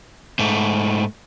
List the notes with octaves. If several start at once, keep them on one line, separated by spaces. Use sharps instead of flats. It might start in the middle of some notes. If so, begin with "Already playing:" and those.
G#2 A3